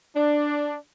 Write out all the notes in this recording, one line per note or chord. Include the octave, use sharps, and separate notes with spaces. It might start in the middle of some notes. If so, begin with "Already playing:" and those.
D4